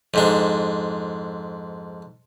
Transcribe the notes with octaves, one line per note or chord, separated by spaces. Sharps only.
F2 G#2 D4